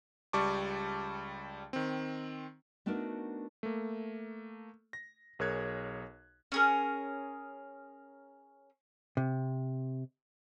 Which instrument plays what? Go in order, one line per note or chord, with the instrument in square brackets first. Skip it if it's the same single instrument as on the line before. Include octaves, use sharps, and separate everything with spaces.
[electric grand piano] C#2 G3 A5 C#6 D6
D#3 C4
[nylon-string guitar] A3 B3 D4 D#4 F#4 A#4
[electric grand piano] A3 A#3
A#6
B1 G#4 A#4 C#5 F#6 G#6
[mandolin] C#4 G#4 A#4
[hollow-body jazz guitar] C3